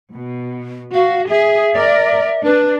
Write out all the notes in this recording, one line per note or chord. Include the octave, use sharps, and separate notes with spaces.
B2
F#4 F5
G#4 E5
A#4 D5
D4 B4